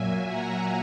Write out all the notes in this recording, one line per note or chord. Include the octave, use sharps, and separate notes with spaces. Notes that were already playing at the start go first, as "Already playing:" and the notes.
Already playing: A#2 F#3 A#3 E5 G#5
F#5 A#5